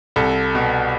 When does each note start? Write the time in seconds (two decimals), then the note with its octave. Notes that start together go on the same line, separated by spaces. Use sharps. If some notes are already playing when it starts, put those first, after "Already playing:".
0.16 C2 A4
0.55 B2